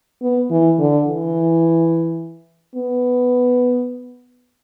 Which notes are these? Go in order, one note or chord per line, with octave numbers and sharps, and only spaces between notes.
B3
E3
D3
E3
B3